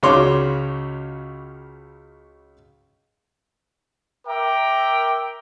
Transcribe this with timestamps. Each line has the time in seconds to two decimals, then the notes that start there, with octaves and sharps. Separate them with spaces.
0.03 C#2 C#3 F#4 C#5 C6 D6
4.26 A#4 E5 G5 A#5 D6